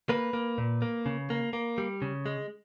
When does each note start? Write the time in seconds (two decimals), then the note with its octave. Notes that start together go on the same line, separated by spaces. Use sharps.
0.09 A#3 B4
0.33 A#3
0.58 A#2
0.82 A#3
1.06 C#3
1.30 A#3
1.53 A#3
1.78 G3
2.02 C#3
2.26 G#3